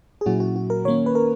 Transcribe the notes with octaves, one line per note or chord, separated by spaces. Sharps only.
G#4
A#2 F#3 C#4 E4 F#4
F#4
F#4
A#4
D#3 A#3 C#4 C#5
B4
A#4